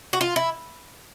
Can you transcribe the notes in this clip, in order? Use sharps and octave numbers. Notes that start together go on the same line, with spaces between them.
F#4
F4
E4